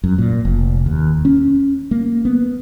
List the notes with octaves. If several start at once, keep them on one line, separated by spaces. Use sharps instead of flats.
F#2
A#2
F1
D#2
C#4
A#3
B3